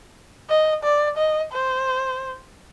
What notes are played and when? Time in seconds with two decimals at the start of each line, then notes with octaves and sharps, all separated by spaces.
0.50 D#5
0.84 D5
1.17 D#5
1.52 C5